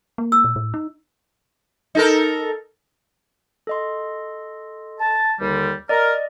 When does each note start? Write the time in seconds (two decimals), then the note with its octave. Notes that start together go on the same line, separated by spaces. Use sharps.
0.18 A#3
0.32 E6
0.44 A#2
0.56 A2
0.74 D#4
1.95 D#4 A4 A#4
3.67 A4 D#5 C6
5.00 A5
5.40 D#2 D3 G3
5.89 A#4 D5 D#5